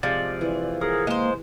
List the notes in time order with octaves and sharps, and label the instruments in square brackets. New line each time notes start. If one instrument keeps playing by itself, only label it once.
[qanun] C3 G#3 [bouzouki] F3 [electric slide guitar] D5
[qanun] E3
[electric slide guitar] G#4 A#4 [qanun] F#5
[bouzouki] G#3 C5 [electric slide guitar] A#3